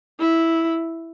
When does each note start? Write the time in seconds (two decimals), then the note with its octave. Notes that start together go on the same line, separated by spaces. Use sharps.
0.20 E4